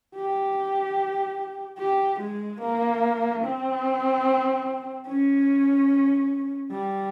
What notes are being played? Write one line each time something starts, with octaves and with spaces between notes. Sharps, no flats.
G4
G4
G#3
A#3
C4
C#4
G3